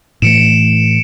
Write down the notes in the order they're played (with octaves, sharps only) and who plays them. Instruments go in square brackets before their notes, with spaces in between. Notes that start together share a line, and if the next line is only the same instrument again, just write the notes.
[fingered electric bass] A2 E3 A3 [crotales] C#7 D7 E7